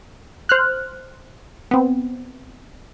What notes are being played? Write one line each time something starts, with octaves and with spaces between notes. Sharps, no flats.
C5 F6 F#6
B3 C4